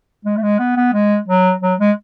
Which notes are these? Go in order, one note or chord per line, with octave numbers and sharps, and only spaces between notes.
G#3
A3
G#3
B3
B3
G#3
F#3
F#3
G#3